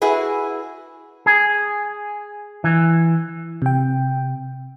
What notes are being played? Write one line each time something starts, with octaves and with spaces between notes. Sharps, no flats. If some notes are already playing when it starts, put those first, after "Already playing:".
E4 F#4 G#4 B4
G#4
E3
C3 G5